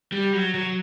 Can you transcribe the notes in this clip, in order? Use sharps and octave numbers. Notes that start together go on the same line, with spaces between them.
G3
F#3
F#3